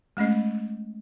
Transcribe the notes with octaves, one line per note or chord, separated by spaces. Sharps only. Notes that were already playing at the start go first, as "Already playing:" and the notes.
G#3 A3 C#4 D#5